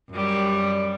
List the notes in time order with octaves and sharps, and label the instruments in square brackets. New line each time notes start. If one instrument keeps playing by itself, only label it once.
[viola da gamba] F#2 G3